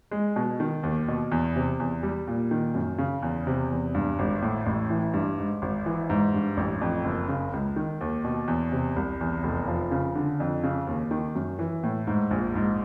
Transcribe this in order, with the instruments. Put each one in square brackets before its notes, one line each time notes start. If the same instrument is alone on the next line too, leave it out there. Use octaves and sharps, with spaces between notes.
[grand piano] G#3
B2
D#3
D#2
B2
E2
C3
E2
G3
A#2
D#3
F#2
C#3
E2
C3
E2
G2
G#1
A2
A1
E3
G2
G#2
G#1
E3
G#2
G2
A1
F2
F#1
C#3
C#2
D#3
D#2
B2
E2
C3
C2
E2
F1
F3
C#3
D3
F2
C#3
D#2
D#3
F#2
E3
A2
G#2
A#1
G#2